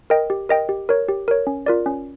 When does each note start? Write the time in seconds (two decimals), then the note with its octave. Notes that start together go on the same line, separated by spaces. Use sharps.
0.10 A#4 D#5 G5
0.30 G4
0.49 A#4 D#5 G5
0.69 G4
0.89 A#4 C#5
1.09 G4
1.28 A#4 C#5
1.47 C#4
1.66 F4 A#4 D5
1.86 C#4